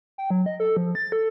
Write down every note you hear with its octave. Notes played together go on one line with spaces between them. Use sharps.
G5
F#3
D#5
A4
F3
A6
A4